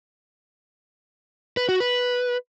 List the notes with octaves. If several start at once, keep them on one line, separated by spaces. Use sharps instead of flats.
B4
F#4
B4